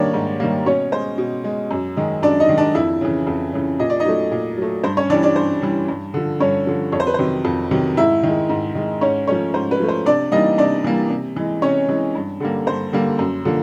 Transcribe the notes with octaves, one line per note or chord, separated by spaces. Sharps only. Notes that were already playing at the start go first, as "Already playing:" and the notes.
Already playing: D#3 G3 A#3 D4 C#5 D5
G#2
D#3 G3 A#3
B2 C#4 C#5
G#3 C5
B2
G#3
F#2
D#3 G#3
F#2 D4 D5
D#4 D#5
D#3 G#3
D4 D5
F2 E4 E5
C#3 E3
F2
C#3 E3
A#2 D#5
D5
D#4 D#5
F#3 A3
A#2
F#3 A3
G2 C5
C#4 C#5
E3 G3 D4 D5
D4 D5
G2 C5
E3 G3
G2
D3 F3
G2 C#4 C#5
D3 F3
F2 C#5
C5
B4
C3 D#3 F#3 C5
F2
C3 D#3 F#3
G#2 E4 E5
D#3 G#3
G#2
D#3 G#3
G#2 C#4 C#5
F3 A3 C#4 C#5
G#2 C5
B4
F3 A3
C5
C3 D4 D5
E3 G3 A#3 D#4 D#5
C3 D4 D5
E3 G3 A#3
C3
E3 G#3
C3 C#4 C#5
E3 G#3
G2
D3 G3 A#3
G2 C5
D3 G3 A#3
F#2
D3 F3 A#3